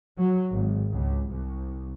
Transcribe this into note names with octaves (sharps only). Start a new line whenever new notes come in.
F#3
G#1
C#2
C2